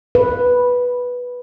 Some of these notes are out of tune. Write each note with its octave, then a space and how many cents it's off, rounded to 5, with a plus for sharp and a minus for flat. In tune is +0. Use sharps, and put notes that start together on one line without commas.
B4 -5